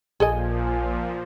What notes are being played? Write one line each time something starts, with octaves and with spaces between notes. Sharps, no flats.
A#1 A#2 F3 G#4 A4 D#5 G#5